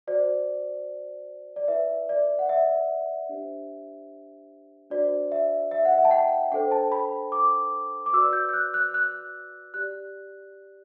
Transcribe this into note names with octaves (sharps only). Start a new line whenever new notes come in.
F#4 C5 D5
D5
E4 B4 D5 E5
D5
F#5
E5
D4 G4 C5
D4 F#4 C5 D5
E5
E5
F#5
E5
A5
G5
D4 A4 C5 G5
A5
B5
D6
D6
F#4 B4 D5 E6
G6
G6
F#6
F#6
F#6
G4 D5 F#6